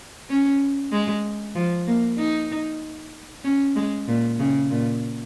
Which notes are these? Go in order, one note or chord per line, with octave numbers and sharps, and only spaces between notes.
C#4
G#3
F3
A#3
D#4
C#4
G#3
A#2
C#3
A#2